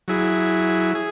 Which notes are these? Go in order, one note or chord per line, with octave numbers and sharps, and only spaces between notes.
F#3 E4 G#4
G#4